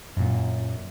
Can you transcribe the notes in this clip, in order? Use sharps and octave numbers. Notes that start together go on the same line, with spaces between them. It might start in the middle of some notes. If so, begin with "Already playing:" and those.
F#2 A#2